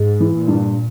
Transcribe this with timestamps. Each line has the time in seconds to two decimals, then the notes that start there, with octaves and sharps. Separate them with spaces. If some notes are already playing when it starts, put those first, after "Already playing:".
Already playing: G#2 G#3
0.20 E3
0.34 A#2
0.48 G2